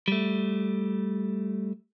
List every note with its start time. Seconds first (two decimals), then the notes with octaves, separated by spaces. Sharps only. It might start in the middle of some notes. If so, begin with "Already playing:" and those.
0.08 G3 A3